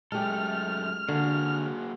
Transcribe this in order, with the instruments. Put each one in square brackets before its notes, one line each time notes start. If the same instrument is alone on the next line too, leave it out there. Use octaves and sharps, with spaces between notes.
[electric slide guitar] F#2 A3 A4 [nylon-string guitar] G#3 G4 [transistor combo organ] F6
[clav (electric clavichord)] D3 [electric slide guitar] A#3 F#4 G#4